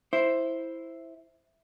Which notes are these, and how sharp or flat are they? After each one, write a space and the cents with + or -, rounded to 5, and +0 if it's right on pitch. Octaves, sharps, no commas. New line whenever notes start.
E4 +0 C5 +0